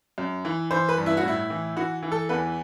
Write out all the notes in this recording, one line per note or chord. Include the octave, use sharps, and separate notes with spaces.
F#2
E3
E3 C5
B4
G2
E4
F#4
A2 E4
E3
E3 F#4
E3
A4
E2 B4